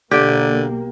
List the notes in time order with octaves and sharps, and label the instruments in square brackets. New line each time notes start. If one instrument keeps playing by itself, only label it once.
[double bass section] B1 A#3 [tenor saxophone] D3 [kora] G4